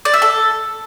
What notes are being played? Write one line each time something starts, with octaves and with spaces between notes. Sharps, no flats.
D5
E5
A4